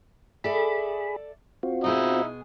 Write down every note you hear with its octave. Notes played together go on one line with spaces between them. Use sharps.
G#4 A4 D5 E5 B5
C4 F4 F#4
B2 G#3 D#4 E4 G#4 D#5